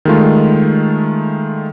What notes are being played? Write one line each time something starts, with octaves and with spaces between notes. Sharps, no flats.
D#3 G#3 A3 F4